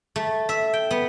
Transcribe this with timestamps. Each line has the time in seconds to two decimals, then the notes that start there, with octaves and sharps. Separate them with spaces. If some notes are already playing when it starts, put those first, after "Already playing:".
0.16 A3
0.49 E5
0.73 G5
0.91 B3